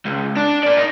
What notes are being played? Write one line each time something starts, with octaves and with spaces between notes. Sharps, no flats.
C#2
D4
A#3 D5
D#4